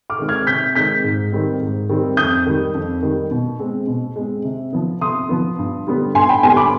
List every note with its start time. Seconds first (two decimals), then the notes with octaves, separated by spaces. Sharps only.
0.10 D6 F6
0.19 D#3 G#3 C4
0.29 F6 G#6
0.47 C3 G6 B6
0.75 D#3 G#3 C4 G6 B6
1.04 G#2
1.32 D#3 G3 C4
1.61 G#2
1.89 D#3 G3 C4
2.17 F2 D#6 G6
2.47 D#3 G3
2.74 F2
3.03 D#3 G3
3.31 B2
3.59 G#3 C4
3.87 B2
4.16 G#3 C4
4.45 C3
4.73 F3 B3
5.01 C3 C6 D#6
5.29 F3 B3
5.59 G2
5.87 D3 G3 B3
6.14 G2 G#5 C6
6.29 G5 B5
6.43 D3 G3 B3 G#5 C6
6.57 B5 D6